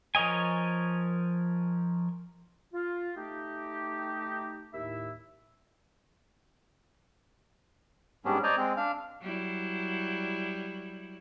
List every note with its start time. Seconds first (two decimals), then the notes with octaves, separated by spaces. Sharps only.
0.15 F3 A#4 C#5 D#5 G#5
2.74 F4
3.16 A3 D#4 G4
4.74 D#2 A2 D#4 E4 E5
8.25 G#2 G3 B3 C#4 D4
8.44 C5 D5 D#5 G#5 A#5
8.57 G#3 C4
8.77 D4 F5
9.21 F#3 G3 E4